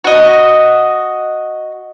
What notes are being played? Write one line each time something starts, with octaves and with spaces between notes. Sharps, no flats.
F#4 D#5